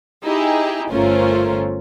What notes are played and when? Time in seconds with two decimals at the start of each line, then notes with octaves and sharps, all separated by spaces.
0.22 D#4 E4 G4 G#4
0.90 G1 A3 C#4 F4 A#4 C5